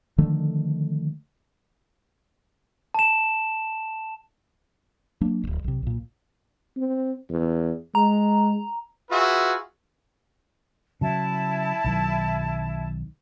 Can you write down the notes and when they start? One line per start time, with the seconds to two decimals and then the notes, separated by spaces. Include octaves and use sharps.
0.18 D3 D#3 F3 A3
2.94 A5 E7
5.21 F#3 A#3 D4
5.44 D1 G#1
5.64 B1 C3
5.83 B1 A#2
6.77 C4
7.30 E2
7.95 G#3 A#5
9.10 F4 F#4 G#4 B4 E5
11.01 C#3 F#3 E4 A5
11.84 B1 D#3 F#3